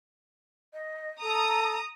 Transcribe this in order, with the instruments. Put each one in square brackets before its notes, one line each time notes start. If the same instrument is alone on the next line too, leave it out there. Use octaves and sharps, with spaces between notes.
[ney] D#5
[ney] A4 [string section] A#5 D#6